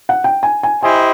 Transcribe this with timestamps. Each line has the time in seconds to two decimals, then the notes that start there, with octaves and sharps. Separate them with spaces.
0.09 F#5
0.24 G5
0.43 G#5
0.63 G#5
0.82 E4 G4 C5 D#5 G#5